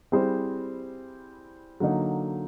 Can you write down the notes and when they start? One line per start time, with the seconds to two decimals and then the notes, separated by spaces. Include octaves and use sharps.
0.12 G3 C4 E4 G#4 C5
1.80 D3 F#3 A#3 D#4